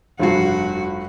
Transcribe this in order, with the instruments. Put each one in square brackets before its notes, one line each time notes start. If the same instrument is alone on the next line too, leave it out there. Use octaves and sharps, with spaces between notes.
[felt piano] F1 G2 C7 [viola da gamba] F#4